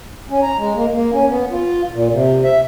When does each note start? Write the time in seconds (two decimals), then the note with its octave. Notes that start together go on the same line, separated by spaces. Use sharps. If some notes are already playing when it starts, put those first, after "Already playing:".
0.30 C#4
0.43 A#5
0.58 G#3
0.75 A#3
0.93 A#3
1.13 C#4
1.28 B3
1.51 F4
1.91 A#2
2.11 C3
2.44 E5